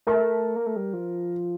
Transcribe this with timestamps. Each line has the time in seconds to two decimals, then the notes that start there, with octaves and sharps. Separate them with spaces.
0.07 A3 A#4
0.56 A#3
0.66 A3
0.76 G3
0.93 F3